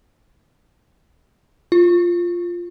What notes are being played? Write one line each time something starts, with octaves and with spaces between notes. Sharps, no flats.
F4